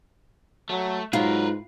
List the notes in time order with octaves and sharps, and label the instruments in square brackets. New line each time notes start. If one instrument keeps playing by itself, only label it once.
[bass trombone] F#3 [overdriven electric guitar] A3
[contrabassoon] G#2 [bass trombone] F#3 [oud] F4 [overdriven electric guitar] A#4 B4